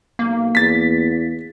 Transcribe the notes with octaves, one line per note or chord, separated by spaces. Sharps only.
B1 A#3
E2 A6 B6